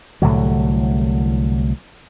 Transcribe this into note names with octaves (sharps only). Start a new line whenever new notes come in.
C2 A2 D3 F#3